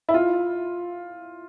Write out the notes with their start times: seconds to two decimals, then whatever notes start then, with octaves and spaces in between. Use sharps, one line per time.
0.09 E4
0.14 F4